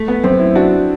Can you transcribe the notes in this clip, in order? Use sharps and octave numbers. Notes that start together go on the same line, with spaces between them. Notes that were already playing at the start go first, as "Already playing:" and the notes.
Already playing: A3
B3
F#2 C4
E4
D4 F#4